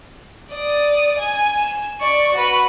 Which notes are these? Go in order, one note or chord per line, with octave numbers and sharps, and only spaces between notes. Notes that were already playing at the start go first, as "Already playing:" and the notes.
D5 D#6
G#5
E7
D5 C#6
F#4 B4